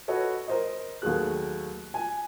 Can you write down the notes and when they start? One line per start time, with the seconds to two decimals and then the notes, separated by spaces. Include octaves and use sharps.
0.08 F#4 A4 B4 C#5 D#5
0.48 A#4 C5 D#5
1.02 D#2 F#3 A3 G#4 F#6
1.94 G#5